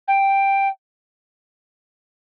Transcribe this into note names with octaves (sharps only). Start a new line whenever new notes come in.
G5